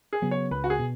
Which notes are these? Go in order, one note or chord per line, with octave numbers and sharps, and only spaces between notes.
G#4
C#3 F#3 B3
C#5
C#2 B4
F#4
G#4
B2